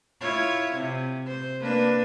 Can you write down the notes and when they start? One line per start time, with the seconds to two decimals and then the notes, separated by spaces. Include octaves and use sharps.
0.21 E4 F4 C#5
0.75 C3
1.27 C5
1.60 A#3 D4 B4